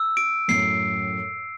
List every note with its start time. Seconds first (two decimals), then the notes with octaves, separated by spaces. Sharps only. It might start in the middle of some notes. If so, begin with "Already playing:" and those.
Already playing: E6
0.17 D7
0.48 F#2 A2 C7